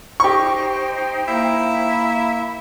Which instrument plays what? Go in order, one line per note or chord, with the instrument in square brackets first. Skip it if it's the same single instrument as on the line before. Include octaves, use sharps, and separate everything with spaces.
[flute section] D#4 C5 G5 [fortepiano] G4 C#6
[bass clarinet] A#3 [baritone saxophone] E4